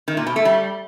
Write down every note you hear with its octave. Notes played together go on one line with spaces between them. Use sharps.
D#3
A#2
B2
A3
G3